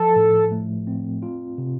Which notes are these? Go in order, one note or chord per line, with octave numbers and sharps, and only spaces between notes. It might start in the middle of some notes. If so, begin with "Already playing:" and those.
Already playing: F3 A4
A2
A3
C4
F4
C3